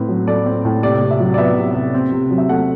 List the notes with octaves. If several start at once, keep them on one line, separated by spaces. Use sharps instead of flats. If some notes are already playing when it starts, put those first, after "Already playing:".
Already playing: A2 C4 B4
F#3
A3 D5
C4
A2
C3 D5
C3
E5
F#3
D5
B3 E5
C3
C3
C4
C3
F#3
E5
A3 F#5